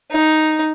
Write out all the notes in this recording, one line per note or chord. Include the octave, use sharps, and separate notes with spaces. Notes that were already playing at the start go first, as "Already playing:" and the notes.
D#4